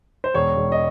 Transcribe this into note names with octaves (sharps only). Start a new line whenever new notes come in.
C5
E1 C#5
E1
D#5